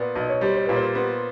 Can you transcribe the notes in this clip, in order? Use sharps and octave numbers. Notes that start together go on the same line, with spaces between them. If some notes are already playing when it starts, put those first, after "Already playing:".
Already playing: A#2 B3 D5
B1 D#5
C#5
G3 C5
C5
A#2 B4
C5
B3